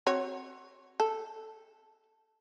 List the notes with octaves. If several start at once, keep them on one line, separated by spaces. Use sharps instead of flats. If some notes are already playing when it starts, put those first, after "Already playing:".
C4 F#4 C#5
A4